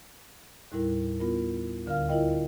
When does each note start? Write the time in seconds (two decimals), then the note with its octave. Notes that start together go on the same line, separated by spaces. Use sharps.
0.72 D#2 A2 G3 E4 A#4
1.20 B3 F4 A#4
1.86 D2 D3 A#4 F5 F6
2.09 E4 F4 A#4 D#5 G5